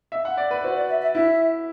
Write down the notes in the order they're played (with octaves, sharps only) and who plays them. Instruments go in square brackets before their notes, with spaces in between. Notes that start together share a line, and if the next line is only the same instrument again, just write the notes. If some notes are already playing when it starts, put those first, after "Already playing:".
[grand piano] E5
F#5
D5
B4
[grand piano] F#4 [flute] C5
[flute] D5
E5
E5
[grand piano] E4 [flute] E5